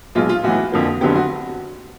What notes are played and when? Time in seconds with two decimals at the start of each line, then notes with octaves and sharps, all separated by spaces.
0.15 B1 B2 G#3 F4
0.29 F4
0.44 B1 A2 E3 F#4
0.72 F2 D3 F3 A#3
1.01 F1 F2 D3 F#3 B3 G4
1.15 F#4